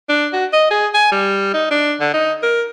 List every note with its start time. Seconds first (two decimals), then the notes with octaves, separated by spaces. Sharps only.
0.09 D4
0.33 F#4
0.53 D#5
0.71 G#4
0.94 G#5
1.12 G3
1.53 D#4
1.71 D4
2.00 D3
2.14 D#4
2.43 A#4